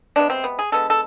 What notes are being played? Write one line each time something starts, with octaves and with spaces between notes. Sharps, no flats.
C3 G#3 B3 D4
C4
B3
G#4
D3 G#3 B3 A4
A4